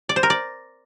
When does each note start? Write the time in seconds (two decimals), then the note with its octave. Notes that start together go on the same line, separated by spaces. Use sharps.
0.09 D5
0.16 C5
0.23 A#4
0.30 D5